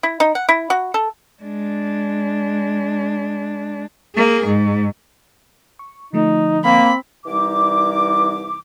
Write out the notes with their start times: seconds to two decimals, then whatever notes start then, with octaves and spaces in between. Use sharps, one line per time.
0.03 E4
0.20 D#4
0.35 F#5
0.49 E4
0.70 F#4
0.94 A4
1.43 G#3 D4
4.16 A#3 G#4
4.46 G#2
5.79 C#6
6.13 D3 F3 A3 D#4
6.64 A#3 C4 B5
7.26 C2 E3 G3 D#4 D6